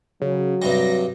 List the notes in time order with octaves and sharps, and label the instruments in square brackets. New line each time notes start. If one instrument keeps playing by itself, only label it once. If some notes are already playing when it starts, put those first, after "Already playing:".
[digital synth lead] C#3 [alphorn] F#3
[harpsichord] G2 C3 G3 [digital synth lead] A#6